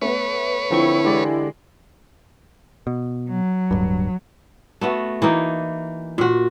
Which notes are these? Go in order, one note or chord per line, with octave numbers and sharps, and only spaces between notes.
A3 B3 B4 C#5
D3 F3 C4 E4 C#6
D3 E3 G#3 G4 D5
B2
F#3
D1 G2
A3 B3 F#4
E3 A#3 D#4
A#2 F#4